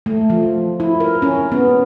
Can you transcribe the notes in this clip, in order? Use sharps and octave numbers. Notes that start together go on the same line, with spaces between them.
A3
F3
E4
A#4
C#4
B3